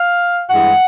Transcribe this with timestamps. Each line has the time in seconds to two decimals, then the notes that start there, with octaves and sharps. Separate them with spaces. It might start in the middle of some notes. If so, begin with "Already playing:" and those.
Already playing: F5
0.50 G2 E3 G#3 F#5